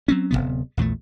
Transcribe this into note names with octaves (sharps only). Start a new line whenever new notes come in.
F#3 C4 C#4
D1 E2 C3 B3
A#1 E2 A#2 A3